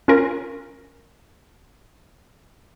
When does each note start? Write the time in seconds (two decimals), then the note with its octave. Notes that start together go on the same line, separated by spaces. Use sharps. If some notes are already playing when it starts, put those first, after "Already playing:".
0.08 C#4 F4 A#4